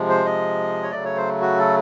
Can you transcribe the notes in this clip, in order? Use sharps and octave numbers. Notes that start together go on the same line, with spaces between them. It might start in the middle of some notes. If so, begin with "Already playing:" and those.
Already playing: C3 F3 G#3
C5
D#5
C#5
C#3 F#3 A3 D5
C#5
C5
F#4
A4